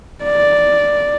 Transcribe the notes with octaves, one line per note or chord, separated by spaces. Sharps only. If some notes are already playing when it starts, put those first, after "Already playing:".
D5